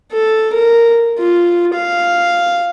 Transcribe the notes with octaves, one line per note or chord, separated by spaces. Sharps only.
A4
A#4
F4
F5